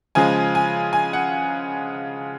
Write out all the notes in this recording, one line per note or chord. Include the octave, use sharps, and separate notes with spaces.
C#3 F3 G#3 G#5
G#5
G#5
F#5